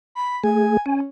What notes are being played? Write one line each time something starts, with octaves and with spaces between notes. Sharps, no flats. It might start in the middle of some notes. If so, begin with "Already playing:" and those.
B5
A3 G#4 G#5
C#4 G#5